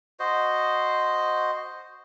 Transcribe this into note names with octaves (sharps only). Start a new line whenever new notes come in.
F#4 C5 D#5